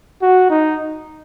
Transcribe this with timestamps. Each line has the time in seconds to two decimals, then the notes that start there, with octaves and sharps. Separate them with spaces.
0.22 F#4
0.50 D#4